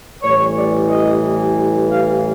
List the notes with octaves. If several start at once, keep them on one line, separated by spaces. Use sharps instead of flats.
A1 A2 E3 G3 C#5
D5
D#5
F5